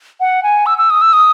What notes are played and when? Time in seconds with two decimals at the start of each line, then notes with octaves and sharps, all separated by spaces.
0.20 F#5
0.43 G#5
0.66 E6
0.78 E6
0.90 D#6
1.02 E6
1.13 D#6